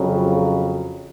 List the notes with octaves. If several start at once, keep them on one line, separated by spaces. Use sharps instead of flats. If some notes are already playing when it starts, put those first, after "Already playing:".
Already playing: F2 C#3 F#3